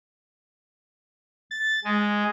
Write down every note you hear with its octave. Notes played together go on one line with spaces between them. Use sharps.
A6
G#3